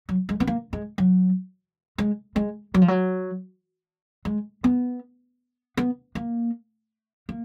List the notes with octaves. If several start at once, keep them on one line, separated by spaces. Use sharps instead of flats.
F#3
G#3
B3
A#3
G#3
F#3
G#3
G#3
F#3
F3
F#3
G#3
B3
B3
A#3
A#3